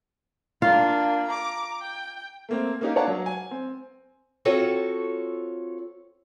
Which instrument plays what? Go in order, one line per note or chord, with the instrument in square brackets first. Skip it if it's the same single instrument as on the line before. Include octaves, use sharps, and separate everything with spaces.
[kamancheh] A#3 D4 [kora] F4
[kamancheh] A#5 D6
G5
[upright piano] A3 A#3 C4
A#3 C#4 D#4 G4 A#4 F5
D4 C#5 D5 F5 F#5 A5
F#3
G#5
C4
[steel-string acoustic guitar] C4 F4 F#4 A4 C#5